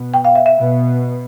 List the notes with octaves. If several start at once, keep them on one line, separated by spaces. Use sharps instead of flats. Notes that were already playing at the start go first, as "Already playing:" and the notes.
Already playing: B2 B3
G5
F5
E5
E5
B2 B3